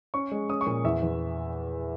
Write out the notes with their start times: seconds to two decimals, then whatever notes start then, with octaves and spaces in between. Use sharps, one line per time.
0.14 C#4 C#6
0.32 G#3
0.49 C#4 D#6
0.61 C#6
0.67 A#2
0.84 E2 E5
1.02 E2